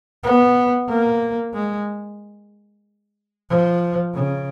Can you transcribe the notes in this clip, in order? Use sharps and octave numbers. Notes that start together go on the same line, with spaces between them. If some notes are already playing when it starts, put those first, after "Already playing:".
B3
A#3
G#3
F3
C#3